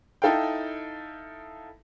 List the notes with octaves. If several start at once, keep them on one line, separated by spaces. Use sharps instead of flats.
D#4 E4 A4 F5 G5